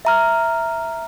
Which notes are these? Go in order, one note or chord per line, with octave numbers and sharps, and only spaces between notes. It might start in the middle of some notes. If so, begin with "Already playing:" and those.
E5 A#5 F6